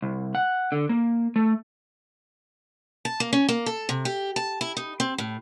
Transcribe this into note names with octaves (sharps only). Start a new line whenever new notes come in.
C2
F#5
D3
A#3
A3
A5
A#3
C#4
A#3
A4
C3
G4
A5
E4
D#4
C4
A2